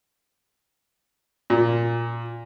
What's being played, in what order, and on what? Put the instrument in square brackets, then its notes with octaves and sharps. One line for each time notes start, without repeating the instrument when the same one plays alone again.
[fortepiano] A#2